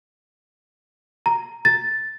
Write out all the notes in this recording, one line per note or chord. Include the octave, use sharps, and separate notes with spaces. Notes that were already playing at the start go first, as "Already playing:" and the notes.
A#5
A6